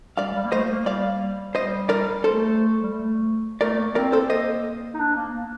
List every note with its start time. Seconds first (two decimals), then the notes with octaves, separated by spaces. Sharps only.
0.17 G3 D5 F5
0.35 G3
0.44 A#3
0.52 A3 C5 D#5
0.70 A#3
0.86 G3 D5 F5
1.55 G3 C5 D#5
1.89 A#4 D5
2.24 A3 A4 C5
2.83 G3
2.92 A3
3.61 A3 A#4 D5
3.78 A#3
3.95 C4 A#4 D5
4.12 A#3 A4 C5
4.30 C5 D#5
4.94 D#4
4.99 D4
5.15 A#3
5.33 A#3